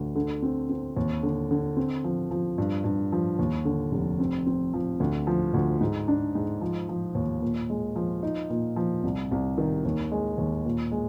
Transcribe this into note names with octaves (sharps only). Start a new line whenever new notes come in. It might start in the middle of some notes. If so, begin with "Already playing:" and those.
Already playing: D2
D3
C4
C4
D#2
D3
D3
C4
F3
F3
G2
G2
F3
D#2
D3
F1
C4
C4
F3
D2
F3
D2
G#2
D4
G#2
F3
F3
D#2
A#2
G#3
F3
D#4
A#2
F3
C2
C2
D#3
D#2
G#3
D#2
A#2
G#3